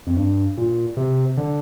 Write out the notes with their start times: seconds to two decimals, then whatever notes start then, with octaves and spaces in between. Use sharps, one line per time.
0.07 F2
0.16 G2
0.58 A#2
0.97 C3
1.37 D3